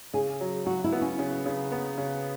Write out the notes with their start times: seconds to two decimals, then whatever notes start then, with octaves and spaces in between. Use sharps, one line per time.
0.13 C#3 G#4
0.41 F#3
0.66 F#3 F#4
0.84 E4
0.93 B3
1.01 C#4
1.19 C#3
1.46 C#3
1.72 B3
1.98 C#3